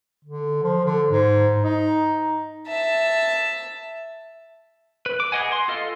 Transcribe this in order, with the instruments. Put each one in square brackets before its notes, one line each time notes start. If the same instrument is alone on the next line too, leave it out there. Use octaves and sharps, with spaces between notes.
[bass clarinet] D3
F3
D3
G#2
D#4
[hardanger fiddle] E5 A5
[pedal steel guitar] B4
D6
G#4 B4 D#5 F#5 G#5
C6
F4 A4 D#5 F5